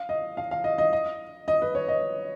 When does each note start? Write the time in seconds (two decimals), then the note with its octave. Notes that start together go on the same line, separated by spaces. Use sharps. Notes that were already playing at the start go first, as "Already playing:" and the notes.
Already playing: F5
0.09 D#5
0.37 F5
0.51 F5
0.64 D#5
0.78 D#5
0.93 D#5
1.48 D#5
1.62 B4
1.75 C#5
1.88 D#5